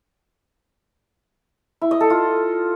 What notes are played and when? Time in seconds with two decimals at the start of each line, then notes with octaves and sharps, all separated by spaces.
1.81 E4
1.91 D#5
2.01 A4
2.10 F4